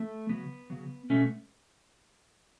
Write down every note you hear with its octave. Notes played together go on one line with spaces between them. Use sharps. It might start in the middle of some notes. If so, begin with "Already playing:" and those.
Already playing: A3
C#3 F#3 B3
C#3 F#3
B2 G#3 A3 C#4